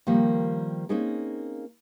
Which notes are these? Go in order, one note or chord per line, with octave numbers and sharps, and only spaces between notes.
D#3 F3 G3 A#3
A#3 C4 C#4 D#4 G#4 A#4